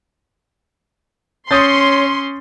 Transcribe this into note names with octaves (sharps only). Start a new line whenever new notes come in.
C#4 C#5 C6 D#6 G6 A6